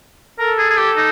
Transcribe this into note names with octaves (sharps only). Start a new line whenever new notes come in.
A4 A#4
G#4
G#4
G4
D#4